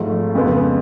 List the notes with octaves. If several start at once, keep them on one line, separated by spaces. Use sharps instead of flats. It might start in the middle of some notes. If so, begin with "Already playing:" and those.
Already playing: G#1 G#2 F3 A3 F4
F2 C#3 G#3 B3